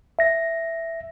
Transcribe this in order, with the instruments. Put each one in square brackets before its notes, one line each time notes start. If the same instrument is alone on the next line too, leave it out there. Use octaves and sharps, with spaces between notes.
[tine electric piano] E5 A#6